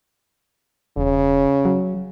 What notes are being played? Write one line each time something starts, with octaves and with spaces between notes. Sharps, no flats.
E1 C#3
F#3